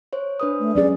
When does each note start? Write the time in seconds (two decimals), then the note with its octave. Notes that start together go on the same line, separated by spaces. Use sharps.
0.13 C5 C#5
0.40 D4 B4 D#6
0.60 A3
0.75 F#3 C#4 G#4 D5